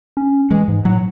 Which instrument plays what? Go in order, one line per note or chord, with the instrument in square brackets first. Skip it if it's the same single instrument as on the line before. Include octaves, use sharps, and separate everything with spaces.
[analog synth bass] C#4
[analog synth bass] E3 [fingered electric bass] G#3
[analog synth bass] G#2
[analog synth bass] A2 [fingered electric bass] F#3